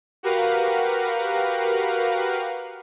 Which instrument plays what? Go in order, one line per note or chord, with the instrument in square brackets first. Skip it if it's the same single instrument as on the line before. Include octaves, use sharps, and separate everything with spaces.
[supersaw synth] F#4 G4 A#4 B4 F5 F#5